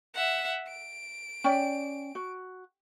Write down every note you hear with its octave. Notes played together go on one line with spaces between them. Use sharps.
E5 F#5
D7
C#4 D5 G5
F#4